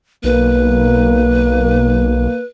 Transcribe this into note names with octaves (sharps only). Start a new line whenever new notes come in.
B1 A#3 B4